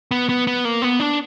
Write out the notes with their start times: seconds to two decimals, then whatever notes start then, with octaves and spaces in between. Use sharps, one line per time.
0.11 B3
0.29 B3
0.47 B3
0.65 A#3
0.82 B3
1.00 D4